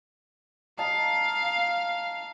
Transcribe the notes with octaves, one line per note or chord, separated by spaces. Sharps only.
D#4 F5 A5